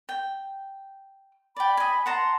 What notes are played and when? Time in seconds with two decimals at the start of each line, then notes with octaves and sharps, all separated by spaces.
0.09 G5
1.56 D5 G5 B5
1.77 D#5 G#5
2.06 F#5 A5 A#5 C6